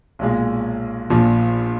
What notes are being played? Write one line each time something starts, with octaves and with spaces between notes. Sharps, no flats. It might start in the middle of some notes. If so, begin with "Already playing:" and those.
B1 A#2 G#3
A#1 A#2 F3